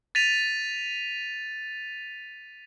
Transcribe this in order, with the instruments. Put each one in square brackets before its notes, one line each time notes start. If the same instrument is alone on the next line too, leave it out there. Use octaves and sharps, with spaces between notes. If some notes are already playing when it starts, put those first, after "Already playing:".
[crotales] A6 B6 D#7 F7